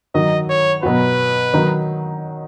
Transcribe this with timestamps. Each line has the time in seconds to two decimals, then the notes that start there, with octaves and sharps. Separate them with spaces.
0.14 D#3 F#3 D#4 D#5
0.49 C#5
0.83 B2 F#3 B3 F#4 B4
1.54 D#3 F#3 D#4